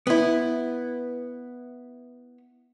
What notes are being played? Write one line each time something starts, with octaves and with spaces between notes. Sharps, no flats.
B3 E4